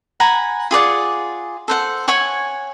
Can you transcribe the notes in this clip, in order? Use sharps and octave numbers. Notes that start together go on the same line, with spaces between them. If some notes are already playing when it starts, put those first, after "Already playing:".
F#5 G#5 A#5 B5
F4 G#4 D5 F#5
A4 C5 F#5
C#5 F#5 G#5 C#6